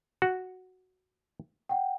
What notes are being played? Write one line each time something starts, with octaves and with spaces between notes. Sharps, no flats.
F#4
F#5 G5